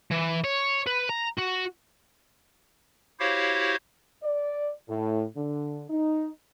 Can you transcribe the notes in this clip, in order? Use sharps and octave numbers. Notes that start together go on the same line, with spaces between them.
E3
C#5
B4
A#5
F#4
E4 F#4 G4 C5 C#5 F5
D5
A2
D3
D#4